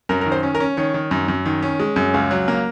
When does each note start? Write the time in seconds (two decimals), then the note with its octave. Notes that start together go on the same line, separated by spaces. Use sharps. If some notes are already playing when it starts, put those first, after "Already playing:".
0.09 F#2 A#4
0.21 D#3 A#4
0.32 C5
0.43 C#4
0.55 A#4
0.60 C#4
0.77 D#3 C#5
0.94 D#3
1.11 F#2
1.28 F#2
1.45 D#3
1.62 C#4
1.80 G#3
1.96 F#2
2.14 C#2
2.31 F#3
2.48 A#3